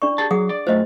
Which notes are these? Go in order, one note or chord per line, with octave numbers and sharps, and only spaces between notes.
D4 D5 C#6
G4 G#4 A5
F#3 G#4 F#5 D#6
D5
F#2 A3 F4 C5 D#5